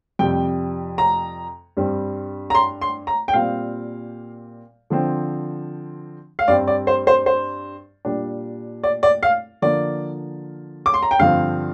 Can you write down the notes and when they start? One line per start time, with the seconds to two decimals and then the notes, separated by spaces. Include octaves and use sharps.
0.19 F2 C3 G3 G5
0.98 A#5
1.77 G2 G3 C4
2.50 A#5
2.55 C6
2.81 C6
3.07 A#5
3.28 G5
3.33 A#2 G3 C4 F5
4.90 D3 F3 C4
6.39 F5
6.48 G2 G3 C4 D5
6.68 D5
6.87 C5
7.07 C5
7.26 C5
8.05 A#2 G3 D4
8.83 D5
9.03 D5
9.23 F5
9.62 D3 F3 A#3 D5
10.86 D6
10.94 C6
11.03 A#5
11.11 G5
11.19 G2 D3 F3 C4 F5